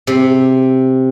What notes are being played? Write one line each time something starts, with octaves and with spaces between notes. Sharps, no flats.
C3